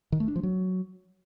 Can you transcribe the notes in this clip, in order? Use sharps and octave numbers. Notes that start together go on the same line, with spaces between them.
D#3
A3
D4
F3
F#3